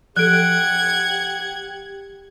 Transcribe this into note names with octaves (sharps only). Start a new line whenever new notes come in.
F3 G4 A4 F#5 F#6 G#6 D7